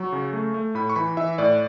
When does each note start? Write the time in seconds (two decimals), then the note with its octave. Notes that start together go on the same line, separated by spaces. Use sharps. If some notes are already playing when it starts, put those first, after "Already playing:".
Already playing: F#3 C#6
0.12 C#3
0.33 A3
0.54 A3
0.75 A2 B5
0.89 C#6
0.96 E3 B5
1.17 E3 E5
1.38 A2 D5